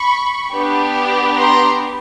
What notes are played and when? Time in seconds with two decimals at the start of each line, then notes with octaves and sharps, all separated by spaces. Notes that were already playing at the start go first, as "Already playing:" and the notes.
Already playing: B5 C#6
0.51 B3 D4 G4
1.37 A#5 C6